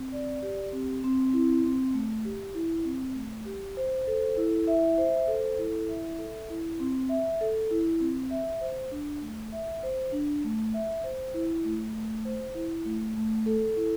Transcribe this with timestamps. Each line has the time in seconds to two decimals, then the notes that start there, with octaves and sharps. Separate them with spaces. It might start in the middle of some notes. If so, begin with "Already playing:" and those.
Already playing: C4
0.12 D5
0.42 G4
0.73 C4
1.04 C4
1.33 E4
1.64 C4
1.94 A3
2.25 G4
2.55 E4
2.85 C4
3.15 A3
3.45 G4
3.77 C5
4.07 A4
4.37 E4
4.67 E5
4.98 C5
5.27 A4
5.58 E4
5.88 E5
6.18 A4
6.50 E4
6.80 C4
7.09 E5
7.41 A4
7.71 E4
8.00 C4
8.31 E5
8.61 C5
8.91 D4
9.22 A3
9.52 E5
9.83 C5
10.12 D4
10.44 A3
10.74 E5
11.04 C5
11.34 E4
11.64 A3
11.95 A3
12.25 C5
12.55 E4
12.85 A3
13.17 A3
13.46 A4
13.77 E4